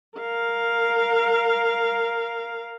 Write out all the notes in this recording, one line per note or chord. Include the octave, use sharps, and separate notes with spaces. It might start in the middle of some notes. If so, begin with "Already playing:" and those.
A#4 F5